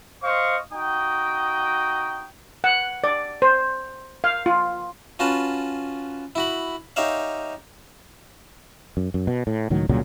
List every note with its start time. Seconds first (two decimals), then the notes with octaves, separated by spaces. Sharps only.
0.24 C5 D#5 F5 C#6
0.73 D#4 F#4 G5 D#6
2.64 F#5
3.04 D5
3.42 C5
4.24 F5
4.46 F4
5.19 C#4 F4 F#4 B4 A5
6.35 E4 F#4 B5
6.96 D#4 G4 C#5 E5 F5
8.97 F#2
9.14 F#2
9.27 B2
9.47 A2
9.70 C#2 A2 D#3 F#3
9.89 C2 A#2 C#3 F#3